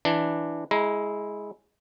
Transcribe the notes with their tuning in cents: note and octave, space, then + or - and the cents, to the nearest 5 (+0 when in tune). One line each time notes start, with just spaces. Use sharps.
E3 +0 D4 +5
G#3 +5 E4 -10 A#5 +20